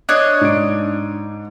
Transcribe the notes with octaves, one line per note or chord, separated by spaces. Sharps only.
D4 C#5 D#5
G#2 D7